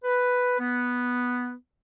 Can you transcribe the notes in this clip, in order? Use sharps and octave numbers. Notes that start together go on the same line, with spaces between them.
B4
B3